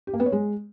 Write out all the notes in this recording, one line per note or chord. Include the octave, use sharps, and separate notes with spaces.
G4
A#3
B3
C#5
G#3